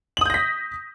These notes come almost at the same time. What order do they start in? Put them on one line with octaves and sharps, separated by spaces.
F#7 D#6 G6 A#6 B6